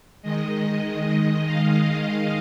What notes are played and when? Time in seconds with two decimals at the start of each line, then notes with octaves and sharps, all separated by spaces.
0.22 D#3 G#3 D#5
1.45 F5
2.07 D#5